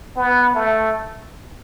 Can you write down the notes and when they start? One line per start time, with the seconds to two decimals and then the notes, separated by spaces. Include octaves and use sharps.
0.16 B3
0.55 A3